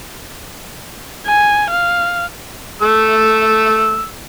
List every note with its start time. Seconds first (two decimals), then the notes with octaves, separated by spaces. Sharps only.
1.27 G#5
1.70 F5
2.82 A3 E6